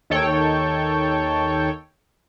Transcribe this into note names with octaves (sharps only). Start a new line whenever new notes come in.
D#2 D#3 A4 C#5 G5